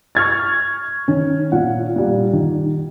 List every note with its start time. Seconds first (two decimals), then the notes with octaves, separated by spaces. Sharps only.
0.15 C#6 F6 G#6 A6
1.08 D#3 C#4
1.52 A#2 F#5
1.96 A#2 G3
2.33 D#3